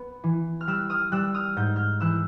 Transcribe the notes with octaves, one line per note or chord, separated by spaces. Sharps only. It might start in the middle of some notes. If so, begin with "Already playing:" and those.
Already playing: B3
E3
F6
G3 E6 F#6
D#6 F6
G3 E6 F#6
D#6 F6
G#2 G6
F6 G6
E3 E6 F#6